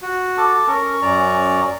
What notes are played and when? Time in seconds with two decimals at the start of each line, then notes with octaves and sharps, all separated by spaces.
0.02 F#4
0.38 A4 A5 D6
0.68 C#4 A#4 C#6
1.02 F#2 D5 A#5